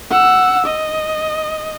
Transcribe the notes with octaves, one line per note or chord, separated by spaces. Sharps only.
F#5 E6
D#5